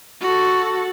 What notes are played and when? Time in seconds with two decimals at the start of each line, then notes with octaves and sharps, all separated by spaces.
0.21 F#4 A4